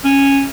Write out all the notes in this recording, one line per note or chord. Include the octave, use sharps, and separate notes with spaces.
C#4